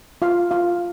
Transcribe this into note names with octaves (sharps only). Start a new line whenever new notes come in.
F4 F5
F4 F5